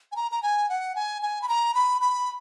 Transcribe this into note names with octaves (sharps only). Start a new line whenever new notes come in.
G#5
A#5
A#5
G#5
F#5
G#5
G#5
B5
A#5
B5
B5